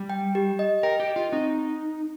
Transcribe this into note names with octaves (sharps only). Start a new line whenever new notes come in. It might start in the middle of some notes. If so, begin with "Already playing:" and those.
Already playing: G3
G5
G4
D#5
A#4 G5
G4
D#5
F4
C4 D#4